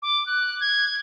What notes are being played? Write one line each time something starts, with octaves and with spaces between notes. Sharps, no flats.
D6
F#6
G#6